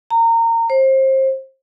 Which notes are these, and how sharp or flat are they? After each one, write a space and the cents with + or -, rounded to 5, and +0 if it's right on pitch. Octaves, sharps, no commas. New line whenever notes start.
A#5 -25
C5 +25